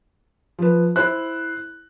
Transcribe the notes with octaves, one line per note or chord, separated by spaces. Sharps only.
F3 B4
E4 C5 F#6